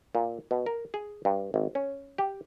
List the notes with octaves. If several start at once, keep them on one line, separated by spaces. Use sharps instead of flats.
A#2
B2
A#4
G#4
G2
G#1
C#4
G4